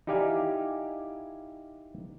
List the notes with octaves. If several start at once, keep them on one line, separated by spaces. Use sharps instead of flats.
D#4 E4 G4 D5 F5 G#5